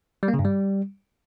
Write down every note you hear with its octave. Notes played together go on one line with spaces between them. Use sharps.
G3
A#3
C#3
G2
G3